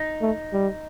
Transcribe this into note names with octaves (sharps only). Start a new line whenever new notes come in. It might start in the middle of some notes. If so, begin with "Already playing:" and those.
Already playing: D#4
A3
G3